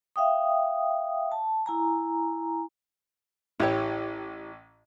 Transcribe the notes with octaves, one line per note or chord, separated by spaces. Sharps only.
E5 F5 G5 D#6
A5
E4 G#5 A#5
A1 E4 G4 C#5